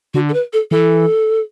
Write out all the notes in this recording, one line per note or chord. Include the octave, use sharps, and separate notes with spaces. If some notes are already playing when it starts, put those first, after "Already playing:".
D3 F#4
A4
B4
A4
E3 A4